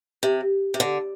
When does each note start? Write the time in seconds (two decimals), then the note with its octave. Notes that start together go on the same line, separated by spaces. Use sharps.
0.23 C3
0.74 C3
0.80 D3